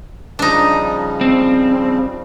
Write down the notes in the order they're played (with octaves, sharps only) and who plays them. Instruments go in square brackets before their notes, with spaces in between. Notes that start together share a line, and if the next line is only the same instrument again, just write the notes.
[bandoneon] C#3 F3 G3 [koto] D4 D#4
[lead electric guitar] C4